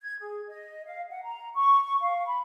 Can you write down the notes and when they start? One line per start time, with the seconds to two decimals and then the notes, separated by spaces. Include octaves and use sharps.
0.01 G#6
0.20 G#4
0.49 D#5
0.86 F5
1.11 F#5
1.24 A#5
1.55 C#6
1.83 C#6
2.00 F5
2.26 B5